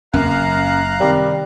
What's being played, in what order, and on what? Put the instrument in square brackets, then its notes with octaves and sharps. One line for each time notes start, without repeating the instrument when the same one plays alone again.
[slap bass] F#1 [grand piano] F#2 A#3 [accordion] F5 A#5 F#6
[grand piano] C3 D#3 [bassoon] G3